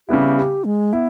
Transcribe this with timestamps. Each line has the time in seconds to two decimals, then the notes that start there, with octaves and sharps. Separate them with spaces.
0.08 C#3 G3 B3 E4 G4
0.38 G4
0.65 G#3
0.93 B3 E4